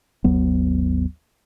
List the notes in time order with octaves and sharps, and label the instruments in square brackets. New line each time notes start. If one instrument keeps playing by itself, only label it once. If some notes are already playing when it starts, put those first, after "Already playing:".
[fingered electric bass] G#1 D#2 F#3 B3